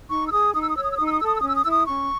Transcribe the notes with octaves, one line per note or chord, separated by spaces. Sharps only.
D#4 C#6
E6
G#4 D#6
D#4 D#6
E6
D#6
C#5 E6
D#6
E6
D#4 D#6
E6
D#6
A4 E6
D#6
E6
C#4 D#6
E6
D#6
E4 E6
D#6
C#4 C#6